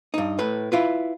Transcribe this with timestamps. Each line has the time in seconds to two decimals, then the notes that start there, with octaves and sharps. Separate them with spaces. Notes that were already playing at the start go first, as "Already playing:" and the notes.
0.14 G2 D#4
0.39 A2 B4
0.72 E4 F4 B4